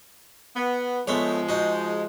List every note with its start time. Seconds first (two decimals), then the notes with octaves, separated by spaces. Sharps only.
0.56 B3
1.08 F3 G#3 A3 B3 C#5
1.49 D#4 F#4